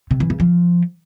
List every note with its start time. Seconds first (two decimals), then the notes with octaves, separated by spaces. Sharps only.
0.11 C3
0.20 E3
0.30 C#3
0.40 F3